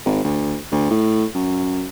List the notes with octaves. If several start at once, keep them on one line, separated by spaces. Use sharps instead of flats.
G#1
D2
D2
A2
F#2